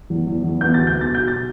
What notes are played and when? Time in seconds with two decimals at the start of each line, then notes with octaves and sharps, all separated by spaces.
0.10 E2
0.27 E2
0.44 E2
0.61 B3 G6
0.74 D2 A6
0.87 G6
0.94 B3
1.01 A6
1.11 B2 G6
1.28 B2 A6